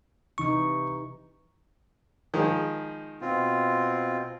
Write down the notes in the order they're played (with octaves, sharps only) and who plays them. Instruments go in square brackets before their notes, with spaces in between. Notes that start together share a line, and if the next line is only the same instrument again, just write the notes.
[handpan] C3 E3 D#4 [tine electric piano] C#6
[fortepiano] D#3 F3 G#3
[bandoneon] B2 C4 F4